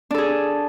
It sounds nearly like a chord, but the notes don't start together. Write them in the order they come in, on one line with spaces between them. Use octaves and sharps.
D4 A4 G#4